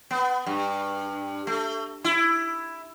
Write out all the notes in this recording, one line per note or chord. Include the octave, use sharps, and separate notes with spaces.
B3
G2
A3
E4